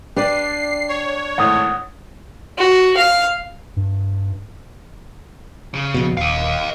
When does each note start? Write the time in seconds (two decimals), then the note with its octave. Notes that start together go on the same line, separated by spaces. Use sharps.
0.16 D4 G4 B4 D5 C7
0.89 C#5
1.38 G#1 A2 F#5 D#6 G#6
2.58 F#4
2.97 F5
3.77 G2
5.74 C#3
5.94 A#1 B2
6.17 D#1 D#5 F5